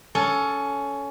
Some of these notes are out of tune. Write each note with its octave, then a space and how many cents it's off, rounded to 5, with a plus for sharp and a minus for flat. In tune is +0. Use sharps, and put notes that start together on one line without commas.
C#4 +15 A4 +0